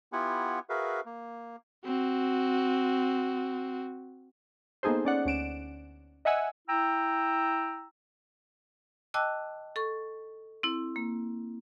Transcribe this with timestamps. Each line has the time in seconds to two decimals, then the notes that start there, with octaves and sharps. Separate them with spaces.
0.13 B3 E4 F4 G4 F#5 G#5
0.69 F#4 G#4 A#4 B4 E5 F5
1.06 A#3
1.85 C4 F#4
4.83 A#3 B3 D#4 G#4 A4 C5
5.05 C#4 D5 F#5
5.25 D2 C#4 D7 E7
6.25 D#5 E5 F#5 G#5 E6
6.68 E4 G5 A#5 E6
9.14 D#5 G5 A5 D6 E6 F#6
9.76 A4 C#6
10.63 C4 E4
10.96 A#3